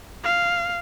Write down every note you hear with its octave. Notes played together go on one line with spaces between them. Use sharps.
F5